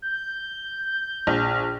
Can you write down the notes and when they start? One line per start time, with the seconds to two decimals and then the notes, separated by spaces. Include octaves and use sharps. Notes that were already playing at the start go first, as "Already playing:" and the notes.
0.02 G6
1.27 A#1